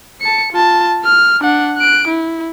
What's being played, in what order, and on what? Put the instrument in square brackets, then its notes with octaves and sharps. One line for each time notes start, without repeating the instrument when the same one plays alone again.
[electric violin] A5 C#7
F4 A5
F6
D4 F#5
F#6 D7
E4